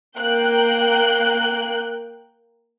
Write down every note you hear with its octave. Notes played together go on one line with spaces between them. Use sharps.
A#3 G5 F#6